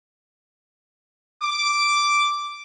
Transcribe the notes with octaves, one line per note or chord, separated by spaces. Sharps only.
D6